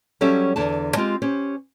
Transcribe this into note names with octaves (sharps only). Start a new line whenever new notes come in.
F#3 G3 C#4 G4 A4 E5
E2 D3 A5
G#3 C4 F4 G4
C#4 G4 C5